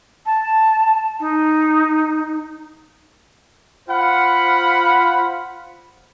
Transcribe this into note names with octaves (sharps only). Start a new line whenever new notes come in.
A5
D#4
F4 C5 F5 F#5 B5